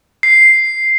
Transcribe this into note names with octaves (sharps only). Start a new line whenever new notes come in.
C7